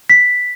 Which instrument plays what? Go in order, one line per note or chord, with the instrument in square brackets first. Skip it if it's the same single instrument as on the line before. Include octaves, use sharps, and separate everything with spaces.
[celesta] B6